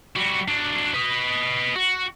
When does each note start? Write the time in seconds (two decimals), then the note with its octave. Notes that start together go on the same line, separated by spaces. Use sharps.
0.16 G3 F#4
0.48 F#3 D4
0.95 B4 D#5
1.76 F#4